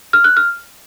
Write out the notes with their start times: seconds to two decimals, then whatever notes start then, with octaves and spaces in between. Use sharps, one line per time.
0.13 F6
0.24 F#6
0.37 F6